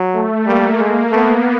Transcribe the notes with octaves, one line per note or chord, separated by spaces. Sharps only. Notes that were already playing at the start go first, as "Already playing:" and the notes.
Already playing: F#3
A3
G3 A#3
G#3
A3 B3